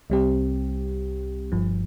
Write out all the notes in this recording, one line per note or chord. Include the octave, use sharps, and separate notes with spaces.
C2 C3 G3 C4 G4
G1 G2 F3